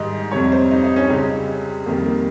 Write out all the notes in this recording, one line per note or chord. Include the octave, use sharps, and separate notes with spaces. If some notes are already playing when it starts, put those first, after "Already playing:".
Already playing: G#2 D#3 G3 D#5
F2 C3 G3 C#5
C5
D#4
D#4
C#4
C#2 C#3 G3 C4
F2 D#3 G3 A#3
A#3